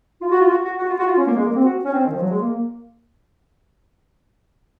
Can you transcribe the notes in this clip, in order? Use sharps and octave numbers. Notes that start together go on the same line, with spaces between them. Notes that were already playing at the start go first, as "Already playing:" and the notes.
F4
F#4
F4
F#4
F#4
F#4
F4
F#4
F4
C#4
A#3
G#3
A#3
C4
F#4
C#4
C4
D#3
F3
F#3
G#3
A#3